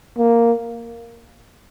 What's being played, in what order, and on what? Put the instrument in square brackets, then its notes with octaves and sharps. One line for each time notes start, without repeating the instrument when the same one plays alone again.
[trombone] A#3